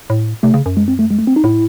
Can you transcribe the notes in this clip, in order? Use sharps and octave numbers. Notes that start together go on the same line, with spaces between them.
A2
C3 A3
C#3
F#2
G#3
C4
A3
G#3
A3
C4
D#4
A2 E4